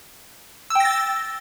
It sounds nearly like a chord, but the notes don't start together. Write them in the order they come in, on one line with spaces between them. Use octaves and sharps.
E6 G5 A#6 A6